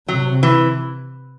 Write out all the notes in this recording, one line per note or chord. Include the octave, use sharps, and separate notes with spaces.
C3 F#3
E3